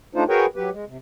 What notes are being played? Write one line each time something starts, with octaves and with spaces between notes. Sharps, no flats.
A3 D4 D#4 F4 C5
F#4 G#4 A#4 B4 C#5 G5
F#3 G4 B4
G#3
C3